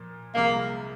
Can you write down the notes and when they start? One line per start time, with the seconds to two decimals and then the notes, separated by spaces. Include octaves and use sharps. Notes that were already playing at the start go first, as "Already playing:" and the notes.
Already playing: A#2 F3 A#3
0.35 C2 C3 F3 G#3 A#3